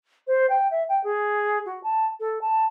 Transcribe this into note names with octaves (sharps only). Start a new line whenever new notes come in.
C5
G5
E5
G5
G#4
F#4
A5
A4
A5